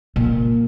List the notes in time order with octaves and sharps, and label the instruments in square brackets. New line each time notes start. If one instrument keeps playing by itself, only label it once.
[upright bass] A#2